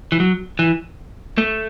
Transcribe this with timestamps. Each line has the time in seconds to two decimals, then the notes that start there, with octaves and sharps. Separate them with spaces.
0.12 E3
0.20 F#3
0.59 E3
1.38 A3